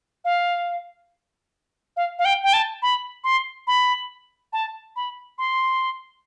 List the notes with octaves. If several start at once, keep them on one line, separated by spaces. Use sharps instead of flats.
F5
F5
F5
G5
G5
A5
B5
C6
B5
A5
B5
C6